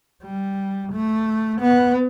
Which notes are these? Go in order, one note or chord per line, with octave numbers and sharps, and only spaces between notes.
G3
A3
B3